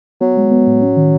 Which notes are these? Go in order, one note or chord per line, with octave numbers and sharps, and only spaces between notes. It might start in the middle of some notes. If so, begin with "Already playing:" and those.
F#3 B3
G#3
B3
A2
C#4
D#3